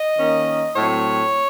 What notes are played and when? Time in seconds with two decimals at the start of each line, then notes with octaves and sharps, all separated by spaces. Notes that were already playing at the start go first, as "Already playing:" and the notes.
Already playing: D#5
0.19 D#3 A#3 C#4
0.76 A2 F#3 C4 C#5